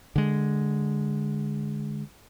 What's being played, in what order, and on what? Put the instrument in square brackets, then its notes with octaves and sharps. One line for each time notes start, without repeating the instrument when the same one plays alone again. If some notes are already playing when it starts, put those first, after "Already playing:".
[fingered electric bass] D3 G#3